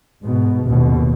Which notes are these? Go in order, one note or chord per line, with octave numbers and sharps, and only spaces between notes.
G#2 B2
A1 D#2 B2